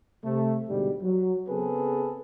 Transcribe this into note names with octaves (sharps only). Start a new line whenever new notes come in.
C3 A3
G#2 B2 D3 G3
F#3
C#3 B3 C4 G#4 A4 B4